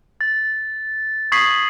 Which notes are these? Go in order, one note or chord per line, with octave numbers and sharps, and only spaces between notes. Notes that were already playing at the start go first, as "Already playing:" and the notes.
A6
C#6 D#6 G#6 B6 C7 F#7